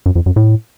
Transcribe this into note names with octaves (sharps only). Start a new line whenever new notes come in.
F#2
F2
F#2
A2